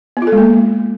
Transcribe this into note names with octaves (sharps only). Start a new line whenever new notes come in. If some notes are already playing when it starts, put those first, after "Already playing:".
B3
F4
A4
G#3
A#3